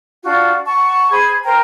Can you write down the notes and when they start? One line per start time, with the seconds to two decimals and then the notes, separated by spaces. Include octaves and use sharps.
0.23 D4 F4 F#4
0.65 F#5 A5 C#6
1.10 G#4 C5 B5 G#6
1.43 A#4 C5 G5 A#5